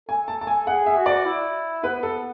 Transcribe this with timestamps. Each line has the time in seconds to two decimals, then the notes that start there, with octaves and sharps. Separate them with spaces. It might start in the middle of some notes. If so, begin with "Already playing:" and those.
0.09 A4 G#5
0.28 A5
0.41 A5
0.47 G#5
0.67 G#4 F#5
0.86 E5
0.97 F#4
1.06 D5
1.25 E4
1.84 B3 B4
2.03 A4